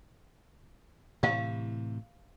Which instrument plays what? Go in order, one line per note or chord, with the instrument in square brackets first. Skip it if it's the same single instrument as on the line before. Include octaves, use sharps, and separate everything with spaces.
[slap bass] A2 C3 E3 [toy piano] G4 F5